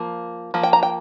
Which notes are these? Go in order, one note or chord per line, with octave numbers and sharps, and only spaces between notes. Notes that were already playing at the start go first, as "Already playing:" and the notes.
Already playing: F3 A#3
F3 A#3
G5
A#5
G5